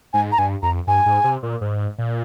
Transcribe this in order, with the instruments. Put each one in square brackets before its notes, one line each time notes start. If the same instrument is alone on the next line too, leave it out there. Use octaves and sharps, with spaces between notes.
[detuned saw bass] G#2 [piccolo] G#5
[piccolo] A#5
[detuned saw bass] G2 [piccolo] G#5
[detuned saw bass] F2 [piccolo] A#5
[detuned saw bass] G2 [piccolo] G#5
[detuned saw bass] G#2
C3
A#2
G#2
A#2